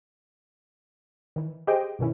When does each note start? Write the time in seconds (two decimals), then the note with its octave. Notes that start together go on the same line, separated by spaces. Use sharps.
1.36 D#3 E3
1.67 G4 G#4 C5 D#5 G5
1.99 G2 B2 D#3 C#4 E4